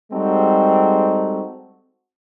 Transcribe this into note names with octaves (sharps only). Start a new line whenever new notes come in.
G3 G#3 C4 D#4 F#4 A4